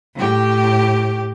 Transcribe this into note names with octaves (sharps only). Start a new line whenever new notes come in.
A2 G4